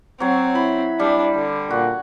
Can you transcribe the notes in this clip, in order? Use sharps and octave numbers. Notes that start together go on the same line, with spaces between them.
F#3 C4 C#5
E4 B5
G3 D4
D3
A#2 F#4